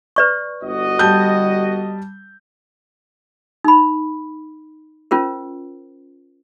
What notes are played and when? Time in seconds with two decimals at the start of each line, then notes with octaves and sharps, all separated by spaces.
0.16 B4 D5 C#6
0.63 G1 F#4 D#5
0.99 G3 A5 G6
3.64 D#4 B5
5.11 C#4 F4 A#4 C5